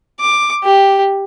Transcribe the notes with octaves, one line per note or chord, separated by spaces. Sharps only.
D6
G4